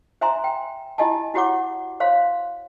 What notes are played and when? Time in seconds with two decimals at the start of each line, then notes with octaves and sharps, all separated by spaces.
0.21 C5 E5 G#5 A#5 C6
0.44 G5
0.98 E4 G4 D#5 G#5 A5
1.34 E4 F#4 G4 C#5 F#5 D6
2.00 C5 C#5 F5 C6